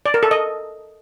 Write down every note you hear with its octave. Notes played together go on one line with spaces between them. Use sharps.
D5
A#4
A4
D#5